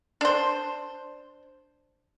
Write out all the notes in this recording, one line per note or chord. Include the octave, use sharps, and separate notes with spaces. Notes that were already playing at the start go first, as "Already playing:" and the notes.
D4 C5